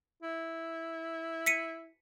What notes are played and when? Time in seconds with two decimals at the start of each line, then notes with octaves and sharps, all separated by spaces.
0.23 E4
1.46 B6 C#7 D#7